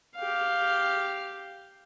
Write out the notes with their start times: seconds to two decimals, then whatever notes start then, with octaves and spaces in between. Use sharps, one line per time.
0.15 G4 F5